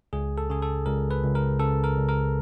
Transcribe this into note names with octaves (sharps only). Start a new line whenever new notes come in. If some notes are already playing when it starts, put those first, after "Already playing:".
C#2 G#4
A4
C#3 G#4
A4
C#2 A#4
B4
C#2
A#4
C#3 A4
A#4
C#2
A#4